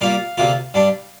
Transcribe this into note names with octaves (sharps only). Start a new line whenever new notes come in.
A#2 G3 A#3 F4 F5
D2 C3 A#3 F4
G2 G3 D4